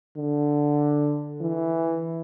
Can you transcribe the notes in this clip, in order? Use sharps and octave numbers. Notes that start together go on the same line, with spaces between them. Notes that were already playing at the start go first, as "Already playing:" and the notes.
D3
E3